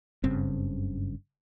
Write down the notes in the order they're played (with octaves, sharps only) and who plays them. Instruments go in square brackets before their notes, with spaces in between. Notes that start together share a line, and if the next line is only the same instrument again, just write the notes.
[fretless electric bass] F#1 G2 C#3 C4